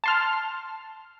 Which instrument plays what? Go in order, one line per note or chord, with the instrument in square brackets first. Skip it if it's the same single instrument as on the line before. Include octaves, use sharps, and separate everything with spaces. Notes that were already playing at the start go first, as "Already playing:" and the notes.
[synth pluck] A5 C6 F6